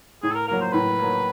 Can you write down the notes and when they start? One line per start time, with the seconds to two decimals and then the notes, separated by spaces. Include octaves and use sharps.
0.23 A2 G#4
0.31 A4
0.35 A#4
0.48 F#3 A#3 A#4
0.61 C5
0.73 A2 B4
0.99 F#3 A#3